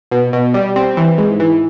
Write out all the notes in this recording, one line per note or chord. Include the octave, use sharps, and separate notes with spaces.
B2
B2
G3
C4
E3
G#2
E3